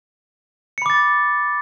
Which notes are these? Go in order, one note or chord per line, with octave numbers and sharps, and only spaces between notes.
B5 D6 A6 C#7